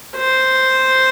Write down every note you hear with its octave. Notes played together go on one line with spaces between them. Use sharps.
C5